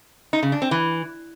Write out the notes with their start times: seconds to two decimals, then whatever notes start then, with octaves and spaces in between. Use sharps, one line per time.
0.33 D#4
0.43 C#3
0.52 D4
0.62 C4
0.71 E3